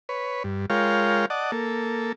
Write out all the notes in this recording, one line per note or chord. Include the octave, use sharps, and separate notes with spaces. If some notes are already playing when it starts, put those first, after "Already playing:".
B4 C#5
G2
G#3 F4 A#4 C#5 F5 G5
D5 D#5 F#5 A5
A#3 A4